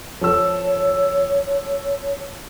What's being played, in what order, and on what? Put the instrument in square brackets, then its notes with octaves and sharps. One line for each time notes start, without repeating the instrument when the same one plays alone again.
[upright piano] F3 A4 E6 [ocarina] C#5